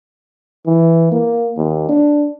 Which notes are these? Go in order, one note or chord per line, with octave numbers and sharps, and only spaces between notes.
E3
A#3
D#2
D4